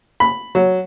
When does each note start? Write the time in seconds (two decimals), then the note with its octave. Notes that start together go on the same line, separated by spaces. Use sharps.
0.20 B5
0.55 F#3